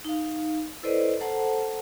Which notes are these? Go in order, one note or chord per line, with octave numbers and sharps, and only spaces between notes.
D#4 F5
E4 A4 B4 C5 D5 D#5
A4 C5 F#5 A5 A#5